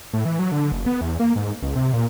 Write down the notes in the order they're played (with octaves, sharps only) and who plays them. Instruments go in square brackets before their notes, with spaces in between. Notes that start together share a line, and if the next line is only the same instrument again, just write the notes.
[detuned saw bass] A2
E3
F#3
D3
F#1
B3
E2
A#3
G#2
C#2
C3
A#2